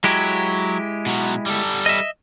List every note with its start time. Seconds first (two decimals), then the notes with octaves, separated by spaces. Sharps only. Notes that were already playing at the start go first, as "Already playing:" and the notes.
0.04 F#3 G#3 E4 G4
1.06 B2 F#3
1.46 G3 A4
1.86 D#5 E5